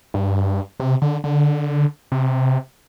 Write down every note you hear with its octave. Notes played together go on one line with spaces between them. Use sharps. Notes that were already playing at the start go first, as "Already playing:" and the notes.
G2
C3
D3
D3
C3